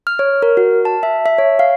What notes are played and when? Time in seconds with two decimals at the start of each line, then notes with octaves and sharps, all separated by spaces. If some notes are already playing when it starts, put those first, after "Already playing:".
0.07 F6
0.19 C#5
0.42 A#4
0.57 F#4
0.85 A5
1.03 E5
1.26 E5
1.38 C#5
1.59 F5